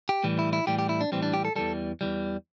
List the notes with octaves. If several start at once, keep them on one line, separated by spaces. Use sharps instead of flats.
G4
A2 E3 G3
E4
E4
A2 E3 G3 G4
G4
E4
D4
A2 E3 G3 C4
D4
G4
A4
E2 E3 G3 A4
E2 E3 G3